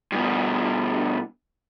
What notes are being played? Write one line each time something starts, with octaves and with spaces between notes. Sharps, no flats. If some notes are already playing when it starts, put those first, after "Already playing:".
G2 B2